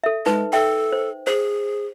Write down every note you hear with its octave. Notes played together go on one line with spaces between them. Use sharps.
A4 E5
G#3 D#4 B4
A4 E5 G5
C5
G#4 C5